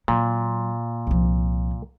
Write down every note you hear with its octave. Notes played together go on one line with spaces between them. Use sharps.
A#2 F#3
C2 F3